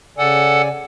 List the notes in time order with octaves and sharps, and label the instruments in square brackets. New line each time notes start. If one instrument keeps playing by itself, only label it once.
[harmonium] C#3 D5 G#5 [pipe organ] A4 F#5